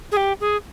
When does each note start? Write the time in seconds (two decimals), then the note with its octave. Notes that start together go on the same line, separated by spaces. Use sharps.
0.12 G#4
0.17 G4
0.41 G#4